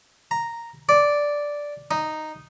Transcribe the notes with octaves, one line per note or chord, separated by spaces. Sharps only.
A#5
D5
D#4